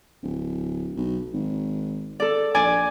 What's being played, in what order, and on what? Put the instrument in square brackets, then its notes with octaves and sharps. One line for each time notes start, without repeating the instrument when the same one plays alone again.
[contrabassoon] D1
B1
G#1
[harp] A4 D5
[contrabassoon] A#1 [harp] D5 G#5